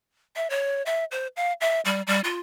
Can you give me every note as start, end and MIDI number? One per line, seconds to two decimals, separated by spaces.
0.36 0.47 76
0.50 0.82 73
0.86 1.04 76
1.11 1.27 72
1.37 1.53 77
1.61 1.81 76
1.85 2.02 55
2.07 2.20 55
2.24 2.40 65